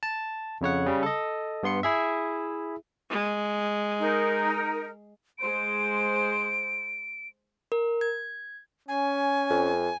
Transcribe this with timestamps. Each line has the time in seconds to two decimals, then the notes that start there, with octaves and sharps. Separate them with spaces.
0.03 A5
0.61 F2 C#3 C#5 F#5
0.86 C#3 G3
1.03 A4 D#5
1.63 G2 B3 C6 C#7
1.83 E4 G#4 E5
3.10 G#3
3.99 D#4 A#4
5.39 G#3 C5 D7
7.72 A#4
8.01 G#6
8.88 C#4 G#5
9.50 F2